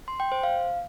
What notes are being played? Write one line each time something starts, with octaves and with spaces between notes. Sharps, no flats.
C6
G5
C5
F5